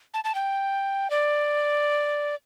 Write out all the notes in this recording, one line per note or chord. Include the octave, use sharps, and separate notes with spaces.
A5
A5
G5
D5